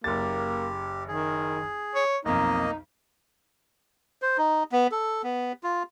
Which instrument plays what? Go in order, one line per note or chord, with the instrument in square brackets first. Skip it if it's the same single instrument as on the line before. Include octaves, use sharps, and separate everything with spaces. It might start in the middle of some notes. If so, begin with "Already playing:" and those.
[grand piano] F#1 A6 [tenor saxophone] A#3 [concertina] G4
[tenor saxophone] D#3 [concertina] G#4
[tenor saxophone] C#5
[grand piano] B1 F2 [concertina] A#3 D#5 [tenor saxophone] D#4
[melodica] C5
D#4
B3
A4
B3
F4